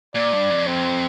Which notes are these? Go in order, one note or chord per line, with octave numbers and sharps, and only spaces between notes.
A#2 D5
G2
F2
C4